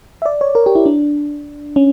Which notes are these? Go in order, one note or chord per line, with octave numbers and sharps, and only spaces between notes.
E5
D5
C#5
A#4
G4
E4
D4
C#4